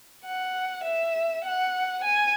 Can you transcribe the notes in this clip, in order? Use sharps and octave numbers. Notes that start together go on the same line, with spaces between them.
F#5
E5
F#5
G#5